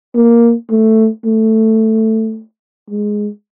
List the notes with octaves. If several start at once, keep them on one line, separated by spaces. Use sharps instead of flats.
A#3
A3
A3
G#3